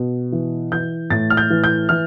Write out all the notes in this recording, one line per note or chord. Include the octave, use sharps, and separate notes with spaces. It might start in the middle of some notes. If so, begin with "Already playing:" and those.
Already playing: B2
E3
E3 G6
A2 A6
F6
G6
E3
G6
E3 F6